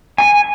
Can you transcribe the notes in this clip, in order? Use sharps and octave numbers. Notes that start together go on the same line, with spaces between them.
G#5